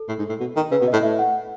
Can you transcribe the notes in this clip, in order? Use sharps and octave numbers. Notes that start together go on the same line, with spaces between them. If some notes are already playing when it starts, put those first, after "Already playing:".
Already playing: A4
A2
G#2
A2
B2
D#3
C#3 B4
B2
A2 D#5
A2 E5
F#5